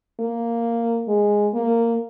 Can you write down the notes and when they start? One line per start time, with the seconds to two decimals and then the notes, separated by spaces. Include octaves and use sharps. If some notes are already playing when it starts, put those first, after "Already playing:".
0.20 A#3
1.08 G#3
1.54 A#3